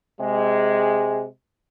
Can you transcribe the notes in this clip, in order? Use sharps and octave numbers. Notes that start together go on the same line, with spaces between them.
C3 G#3